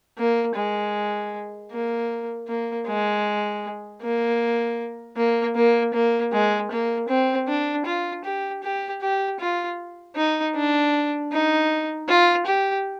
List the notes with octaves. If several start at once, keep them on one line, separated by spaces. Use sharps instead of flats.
A#3
G#3
A#3
A#3
G#3
A#3
A#3
A#3
A#3
G#3
A#3
C4
D4
F4
G4
G4
G4
F4
D#4
D4
D#4
F4
G4